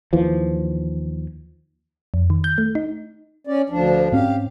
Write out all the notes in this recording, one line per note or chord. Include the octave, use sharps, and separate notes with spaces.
D#2 E3 F3
F2
D#3
G6
A3
D#4
C#4 D5
D2 F3 D4
G#2 C4 C#4 G4 F5